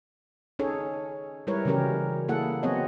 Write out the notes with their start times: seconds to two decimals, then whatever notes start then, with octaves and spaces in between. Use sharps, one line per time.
0.59 C#4 D#4 G#4 A4 C#5
1.47 G3 G#3 E4 A#4 B4 C#5
1.65 C#3 E3 F#3 C#4 G4 A#4
2.28 A#3 E4 G#4 A4 F#5
2.63 F#3 B3 C4 G#4 C#5 D#5